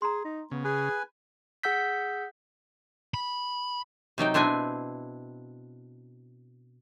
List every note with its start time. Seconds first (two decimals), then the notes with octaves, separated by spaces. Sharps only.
0.02 G#4 A#5 C6
0.24 D#4
0.51 C#3 B3
0.65 G#4 B4 G#5
1.63 G#4 F#5 E6 G6 B6
3.14 B5
4.18 C3 F#3 D#4 G5
4.34 B2 C4 D4 E4 G#5